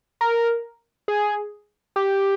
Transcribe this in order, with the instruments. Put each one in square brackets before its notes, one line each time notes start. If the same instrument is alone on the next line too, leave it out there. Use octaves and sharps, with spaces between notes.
[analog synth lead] A#4
G#4
G4